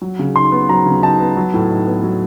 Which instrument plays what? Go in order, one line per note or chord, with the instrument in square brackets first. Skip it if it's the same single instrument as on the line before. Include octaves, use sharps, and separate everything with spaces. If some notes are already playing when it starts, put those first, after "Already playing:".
[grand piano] F#3
C#3
D#4 C6
B3
F#3 A#5
C#3
D#4 A5
B3
F#3
A2
D#4
B3
F#3